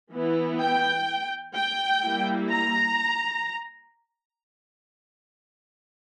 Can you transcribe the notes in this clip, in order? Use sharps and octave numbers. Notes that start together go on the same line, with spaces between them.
E3 B3 E4
G5
G5
G3 A#3 E4
A#5